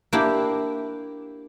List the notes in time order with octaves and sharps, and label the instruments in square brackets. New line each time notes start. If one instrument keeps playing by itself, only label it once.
[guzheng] A#3 D4 E4 G4